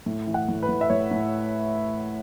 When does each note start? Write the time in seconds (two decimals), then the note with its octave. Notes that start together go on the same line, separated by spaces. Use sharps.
0.06 A2
0.27 E3
0.34 F#5
0.49 A2
0.63 B4
0.69 A2
0.81 E5
0.90 A2 C#5
1.11 A2